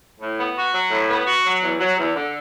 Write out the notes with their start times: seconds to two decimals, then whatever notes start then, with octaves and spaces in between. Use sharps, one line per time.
0.20 A2
0.38 B3
0.56 F#4
0.73 F#3
0.91 A2
1.08 B3
1.27 F#4
1.45 F#3
1.61 E2
1.79 F#3
1.98 E2
2.15 D3